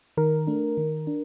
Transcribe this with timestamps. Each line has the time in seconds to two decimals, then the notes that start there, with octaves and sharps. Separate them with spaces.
0.17 D#3 A#4
0.47 A3 D4
0.77 D#3
1.07 D4